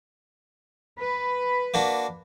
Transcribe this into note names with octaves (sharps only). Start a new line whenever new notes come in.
B4
A#3 D4 F#4